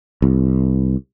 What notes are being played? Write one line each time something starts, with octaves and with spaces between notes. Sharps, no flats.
C2